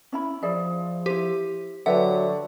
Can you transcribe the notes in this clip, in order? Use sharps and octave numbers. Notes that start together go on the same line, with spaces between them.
C#4 E4 B5
F3 G#4 D5 E5
E4 G4 C5
D3 F#3 G4 B4 E5 F#5